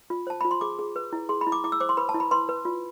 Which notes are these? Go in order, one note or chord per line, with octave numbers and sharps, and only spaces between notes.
F4
C5 A5
F4 B5
C6
G#4 D6
G#4
B4
E4
G#4 C6
B5
E4
D6
E4 D6
E6
C5 D6
C6
B4 B5
A5
E4
B5
B4 C6
B4
F4